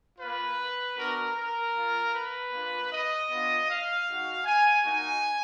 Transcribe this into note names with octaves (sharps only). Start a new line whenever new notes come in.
A#3 F4 B4
B3 D4 F#4 A#4
A#4
A#3 F4
B4
A#3 D4 F4
D#5
B3 D4 F4
F5
G#3 D#4 F#4
G#5
A#3 D#4 F#4 G#5